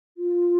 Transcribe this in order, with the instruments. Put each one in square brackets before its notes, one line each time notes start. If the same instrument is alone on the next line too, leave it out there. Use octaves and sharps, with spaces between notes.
[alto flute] F4